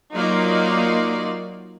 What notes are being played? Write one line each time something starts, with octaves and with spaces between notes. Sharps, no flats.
F#3 A#3 D#4 F4 F#4 D5